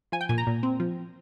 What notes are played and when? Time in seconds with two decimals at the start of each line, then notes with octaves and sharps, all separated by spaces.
0.12 F3 G#5
0.21 G5
0.29 A#2 G#5
0.38 A#5
0.47 A#2
0.63 C4
0.80 F3